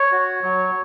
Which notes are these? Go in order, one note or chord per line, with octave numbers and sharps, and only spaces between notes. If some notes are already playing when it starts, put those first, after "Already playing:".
Already playing: C#5
F#4
F#3